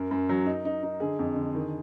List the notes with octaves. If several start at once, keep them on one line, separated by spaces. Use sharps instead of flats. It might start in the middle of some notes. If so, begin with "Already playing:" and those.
Already playing: F#2 A#4
F#2
F#3
D#4
D#4
D#4
D3 G#4
F2
D3
D#3